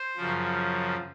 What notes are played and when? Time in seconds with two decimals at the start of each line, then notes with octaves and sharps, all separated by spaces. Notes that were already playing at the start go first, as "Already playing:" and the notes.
Already playing: C5
0.17 F#2 C#3 F3